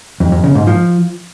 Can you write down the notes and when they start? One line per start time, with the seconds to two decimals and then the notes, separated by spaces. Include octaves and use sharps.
0.20 F2
0.32 F2
0.44 C#3
0.55 G#2
0.67 F3